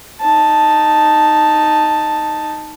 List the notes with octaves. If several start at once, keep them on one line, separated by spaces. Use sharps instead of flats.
D#4 A5